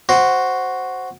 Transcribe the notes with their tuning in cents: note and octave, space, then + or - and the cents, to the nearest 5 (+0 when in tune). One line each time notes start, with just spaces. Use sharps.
F#4 +0 C5 +0